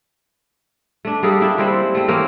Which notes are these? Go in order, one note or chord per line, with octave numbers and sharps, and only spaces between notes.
A3 D4
G3 A#3 G#4 A4
D4 E4 G4
G3 G#3 C4 E4
A3 C4
E3 A#3 C4 C#4